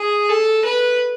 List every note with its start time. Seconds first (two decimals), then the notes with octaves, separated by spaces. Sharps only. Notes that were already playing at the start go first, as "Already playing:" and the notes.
Already playing: G#4
0.29 A4
0.65 B4